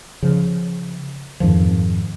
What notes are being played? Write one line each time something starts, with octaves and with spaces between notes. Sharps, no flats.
C#3 F3
F2 G#2 D#3 F3